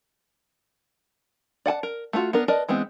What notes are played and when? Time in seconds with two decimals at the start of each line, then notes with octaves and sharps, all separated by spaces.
1.66 D5 F#5 G#5 A5
1.83 A#4
2.13 A3 B3 F4 F#4
2.33 B3 D4 A#4
2.48 A#4 B4 D5 D#5 A5
2.69 E3 G#3 B3 C4